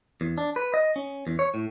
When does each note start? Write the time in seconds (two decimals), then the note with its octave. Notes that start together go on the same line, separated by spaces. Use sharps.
0.21 E2
0.38 D4
0.56 B4
0.74 D#5
0.96 C#4
1.27 E2
1.39 C#5
1.54 A2